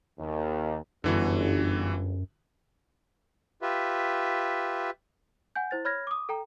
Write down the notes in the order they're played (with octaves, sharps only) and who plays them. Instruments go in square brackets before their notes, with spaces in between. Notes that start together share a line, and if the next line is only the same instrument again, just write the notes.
[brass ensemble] D#2
[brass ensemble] G1 [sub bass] F#2 [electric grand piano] D3 E3 F#4
[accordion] F4 G4 B4 E5
[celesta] F#5 G#5 G6
E4 C5 A6
C#5 B5 F6 G#6 A#6
D6 D#6
A4 G5 A#5